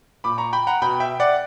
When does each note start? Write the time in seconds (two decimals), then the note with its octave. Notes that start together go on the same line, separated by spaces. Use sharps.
0.24 A#2 B5 D6
0.38 A#5 C#6
0.53 G5 B5
0.67 F#5 A#5
0.82 B2 G5 B5
1.00 E5 G5
1.20 D5 F#5